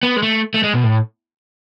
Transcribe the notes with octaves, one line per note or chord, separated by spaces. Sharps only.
B3
G#3
A3
A3
G#3
B2
A2